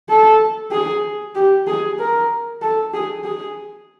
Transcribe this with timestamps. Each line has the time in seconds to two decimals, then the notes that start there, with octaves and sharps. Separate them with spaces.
0.09 A4
0.71 G#4
1.35 G4
1.67 G#4
1.99 A#4
2.62 A4
2.94 G#4
3.24 G#4